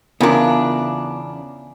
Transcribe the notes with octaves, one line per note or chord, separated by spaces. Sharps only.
E2 C#3 B3 D4 F4 A#4